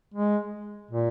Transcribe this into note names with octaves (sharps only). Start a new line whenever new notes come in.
G#3
A#2